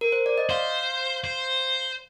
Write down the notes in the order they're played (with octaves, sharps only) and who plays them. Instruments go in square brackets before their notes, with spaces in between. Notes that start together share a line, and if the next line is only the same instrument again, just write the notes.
[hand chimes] A#4
C5
D5
D#5
[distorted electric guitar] C5 [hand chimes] F5
[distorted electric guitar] C5